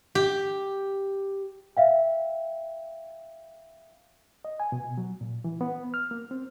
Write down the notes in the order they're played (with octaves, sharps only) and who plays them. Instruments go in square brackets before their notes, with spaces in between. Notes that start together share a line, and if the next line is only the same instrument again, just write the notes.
[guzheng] G4
[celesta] E5 F5 G5
[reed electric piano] D#5
G#5
B2
F#3
A#2
E3
B3
F6
A#3
C4